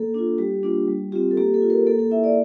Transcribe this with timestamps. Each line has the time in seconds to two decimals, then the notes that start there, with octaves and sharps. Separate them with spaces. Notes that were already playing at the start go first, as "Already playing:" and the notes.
Already playing: A#3 A4
0.14 D4 F4
0.38 G3 G4
0.63 A#3 D4 F4
0.88 G3
1.12 C4 F4 G4
1.31 A4
1.37 A#3 G4
1.54 A4
1.62 F4
1.70 A#4
1.87 A#3 A4
1.99 A4
2.11 E4 E5
2.24 D5